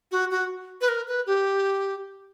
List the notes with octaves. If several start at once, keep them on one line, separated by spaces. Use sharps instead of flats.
F#4
F#4
B4
A#4
B4
G4